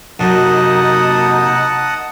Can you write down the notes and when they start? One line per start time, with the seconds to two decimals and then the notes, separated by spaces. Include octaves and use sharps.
0.19 F#2 C3 A#3 D#4 D#5 F#5 A5